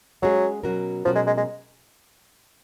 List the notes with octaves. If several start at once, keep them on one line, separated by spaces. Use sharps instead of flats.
F#3 G#3 C#4 G#4
B2 F#3 C#4 F#4 A#4
B2 F3 F#3 C#4 F#4 A#4
G#3
G#3
G#3